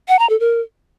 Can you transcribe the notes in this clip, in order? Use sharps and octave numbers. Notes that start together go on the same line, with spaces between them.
F#5
A#5
A4
A#4